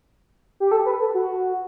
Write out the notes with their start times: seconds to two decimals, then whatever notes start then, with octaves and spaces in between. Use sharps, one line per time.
0.60 G4
0.71 A4
0.86 B4
1.00 A4
1.14 F#4